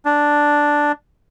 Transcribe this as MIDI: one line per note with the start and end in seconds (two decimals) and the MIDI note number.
0.05 0.92 62